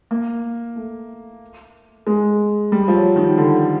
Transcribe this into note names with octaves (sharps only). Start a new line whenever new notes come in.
A#3
A3
G#3
G3
F3
F#3
D#3
D3